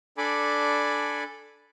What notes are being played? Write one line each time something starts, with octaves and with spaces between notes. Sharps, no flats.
D4 A4 D5 G#5 B5 D6